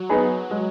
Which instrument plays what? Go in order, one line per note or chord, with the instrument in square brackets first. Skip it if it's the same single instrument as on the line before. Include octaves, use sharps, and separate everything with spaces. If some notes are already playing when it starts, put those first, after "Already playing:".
Already playing: [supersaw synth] F#3
[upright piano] B3 D#4 G#4 B4
G#3